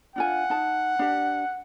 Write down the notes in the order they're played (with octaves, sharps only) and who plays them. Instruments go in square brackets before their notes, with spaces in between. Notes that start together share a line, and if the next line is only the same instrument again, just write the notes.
[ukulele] D4 F4 G#5 [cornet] F#5
[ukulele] D#4 A5
D4 G4